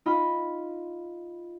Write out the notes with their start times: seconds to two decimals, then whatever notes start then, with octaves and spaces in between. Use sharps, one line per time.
0.06 D#4 F4 B5